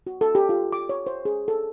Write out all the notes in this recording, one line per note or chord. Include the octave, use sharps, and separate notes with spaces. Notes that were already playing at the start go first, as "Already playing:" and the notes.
F#4
A4
G4
F4
D6
C#5
C5
G#4
A4